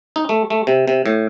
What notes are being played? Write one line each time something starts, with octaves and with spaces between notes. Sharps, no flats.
D#4
A3
A3
C3
C3
A2